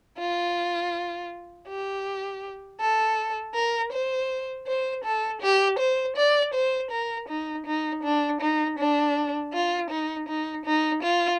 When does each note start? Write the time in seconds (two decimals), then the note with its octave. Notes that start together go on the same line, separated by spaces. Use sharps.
0.18 F4
1.68 G4
2.80 A4
3.55 A#4
3.92 C5
4.67 C5
5.04 A4
5.42 G4
5.79 C5
6.16 D5
6.54 C5
6.91 A#4
7.29 D#4
7.66 D#4
8.03 D4
8.41 D#4
8.79 D4
9.53 F4
9.90 D#4
10.28 D#4
10.65 D#4
11.03 F4